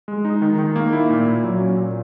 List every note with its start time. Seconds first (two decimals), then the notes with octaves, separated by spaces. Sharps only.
0.08 G#3
0.25 D#4
0.42 D#3
0.58 D#3
0.76 A#3
0.93 E4
1.10 A#2
1.26 A#2
1.44 F#3
1.60 C#4
1.77 A#2